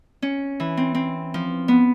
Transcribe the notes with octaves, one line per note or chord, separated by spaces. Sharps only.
C#4
E3
C4
C4
F3
B3